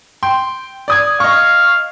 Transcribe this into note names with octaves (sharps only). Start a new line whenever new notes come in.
G5 C6
D5 D#6 G#6
D#5 F5 C#6